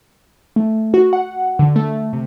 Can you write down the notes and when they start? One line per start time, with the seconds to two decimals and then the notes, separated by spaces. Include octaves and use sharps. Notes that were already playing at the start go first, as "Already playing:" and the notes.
0.56 A3
0.94 F#4
1.13 F#5
1.59 D3
1.76 A3
2.13 C3